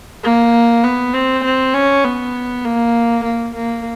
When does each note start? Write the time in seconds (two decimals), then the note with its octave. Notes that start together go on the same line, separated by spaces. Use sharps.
0.23 A#3
0.84 B3
1.14 C4
1.44 C4
1.74 C#4
2.04 B3
2.65 A#3
3.24 A#3
3.55 A#3